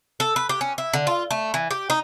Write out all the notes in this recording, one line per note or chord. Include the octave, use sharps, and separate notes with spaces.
A4
B4
G4
C#4
E4
D3
F4
A3
E3
G4
D#4